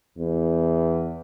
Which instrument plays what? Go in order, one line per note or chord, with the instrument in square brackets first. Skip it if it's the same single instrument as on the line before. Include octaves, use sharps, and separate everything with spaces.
[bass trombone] E2